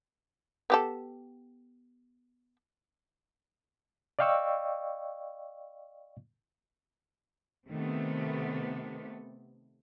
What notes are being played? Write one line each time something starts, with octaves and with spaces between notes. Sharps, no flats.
B3 G4 A4
D5 D#5 F5 G5 C#6 E6
C3 D#3 A3 B3